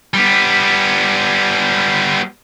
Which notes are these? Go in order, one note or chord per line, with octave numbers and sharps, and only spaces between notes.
G3 B3